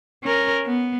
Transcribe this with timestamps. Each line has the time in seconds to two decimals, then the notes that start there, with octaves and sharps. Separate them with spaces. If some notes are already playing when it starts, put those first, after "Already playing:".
0.24 C#4 A#4
0.66 B3